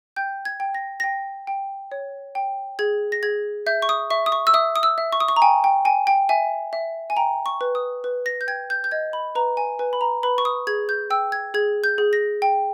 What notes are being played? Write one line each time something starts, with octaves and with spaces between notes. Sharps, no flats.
G5 G6
G#6
G5
A#6
G5 A#6
G5
C#5
G5
G#4 G#6
A#6
G#4 G#6
E5 G6
C#6
D#6
E5 C#6
D#6
C#6
E6
E5 D#6
D#6
E6
E5
C#6
D#6
C#6
A#5
G5 G#5
G5
G5 G#5
G5
E5 G#5
E5
G#5
G5 A#5
C#6
B4
D#6
B4
A#6
G6
G5 G#6
G6
G6
D#5 G#6
B5
B4 A#5
G#5
B4 G#5
B5
A#5
B4 B5
C#6
D#6
G#4 G#6
G6
G5 E6
G#6
G#4 G#6
G6
G#4
A#6
G5